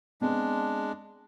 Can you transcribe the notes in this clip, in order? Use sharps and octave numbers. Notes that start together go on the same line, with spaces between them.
G#3 B3 C4 D4